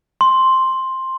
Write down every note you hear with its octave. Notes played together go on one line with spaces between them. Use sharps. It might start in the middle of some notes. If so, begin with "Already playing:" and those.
C6